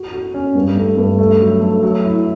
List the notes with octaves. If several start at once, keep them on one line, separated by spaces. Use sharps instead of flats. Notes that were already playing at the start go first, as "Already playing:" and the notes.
Already playing: F#4
F#4
C#4
G2
A3
G2
A3
F#3
A3
F#3
E4